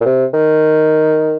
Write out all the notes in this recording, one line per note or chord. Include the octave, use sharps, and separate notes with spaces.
A#2
C3
D#3